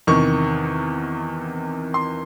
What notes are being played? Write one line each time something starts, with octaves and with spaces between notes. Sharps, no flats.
E2 C3 D#3 C#6
C6